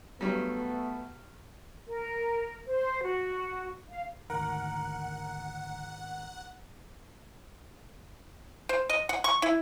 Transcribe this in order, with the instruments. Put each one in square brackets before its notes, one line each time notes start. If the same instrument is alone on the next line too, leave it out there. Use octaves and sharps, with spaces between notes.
[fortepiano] G2 F#3 G3 [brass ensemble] A3 B3
[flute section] A#4
C5
F#4
F5
[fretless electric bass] D2 [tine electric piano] G#2 D#3 [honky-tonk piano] A#4 [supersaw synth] F#5
[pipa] C5
D#5
F#5
C#6
E4